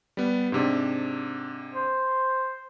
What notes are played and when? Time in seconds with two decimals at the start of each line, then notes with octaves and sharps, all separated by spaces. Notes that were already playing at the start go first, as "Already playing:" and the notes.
0.17 G3 B3
0.52 G#2 C3 D4
1.75 C5